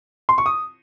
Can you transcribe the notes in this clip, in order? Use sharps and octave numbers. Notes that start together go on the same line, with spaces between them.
C6
C#6
D#6